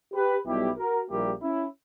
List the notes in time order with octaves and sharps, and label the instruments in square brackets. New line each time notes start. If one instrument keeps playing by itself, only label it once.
[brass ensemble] G4 B4
B1 B2 G3 E4 G4
F#4 A#4
A#1 A#2 G3 A#3 E4 G4
C#4 E4